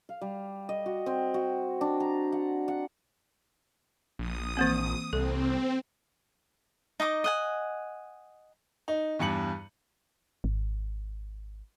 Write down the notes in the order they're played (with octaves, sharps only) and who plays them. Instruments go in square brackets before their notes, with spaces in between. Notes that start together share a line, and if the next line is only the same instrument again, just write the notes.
[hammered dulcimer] F5
G3
D#5
F#4
C4
F#4
D4
A#5
F#5
F#5
[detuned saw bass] A#1 [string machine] D#6
[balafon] E3 A#3 C4
[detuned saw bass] C2 [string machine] C4 [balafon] A4
[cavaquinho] D#4 D#5 E5 D6
D#5 F#5 G#5
[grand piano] D#4
E2 G2 G3 C#7 F#7
[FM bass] G#1